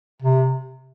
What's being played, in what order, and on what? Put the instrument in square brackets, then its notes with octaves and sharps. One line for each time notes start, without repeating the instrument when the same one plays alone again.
[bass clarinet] C3